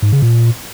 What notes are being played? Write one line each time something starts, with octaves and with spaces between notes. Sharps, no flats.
G#2
C#3
A#2